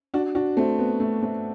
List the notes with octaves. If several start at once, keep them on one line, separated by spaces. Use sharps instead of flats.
D4 F#4
D4 F#4
A3 C4
B3
A3
A3